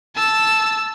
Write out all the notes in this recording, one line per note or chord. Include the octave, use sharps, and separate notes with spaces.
A5 E6